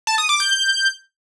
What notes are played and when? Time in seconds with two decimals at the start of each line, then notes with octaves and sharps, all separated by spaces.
0.07 A5
0.18 D#6
0.29 D6
0.40 G6